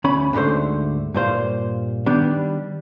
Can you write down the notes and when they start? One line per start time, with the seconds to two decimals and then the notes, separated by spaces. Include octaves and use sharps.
0.04 D2 C#4 B5
0.33 D2 G#2 D3 A3 C5
1.14 G2 A#2 C5 F5
2.06 D#3 G3 B3 D4